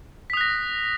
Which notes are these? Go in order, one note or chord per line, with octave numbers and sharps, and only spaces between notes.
D#6 F#6 A#6 B6